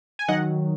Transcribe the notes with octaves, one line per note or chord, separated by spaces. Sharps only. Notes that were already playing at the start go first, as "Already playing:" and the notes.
G#5
D#3 F#3 D#5 F#5